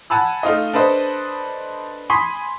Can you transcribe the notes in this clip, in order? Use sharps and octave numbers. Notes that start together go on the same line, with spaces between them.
F#5 G#5 A5 B5 E6
A3 D#4 F4 D#5
D4 A4 B4 C5 D#5
G#5 B5 C6 D#6 B6 C7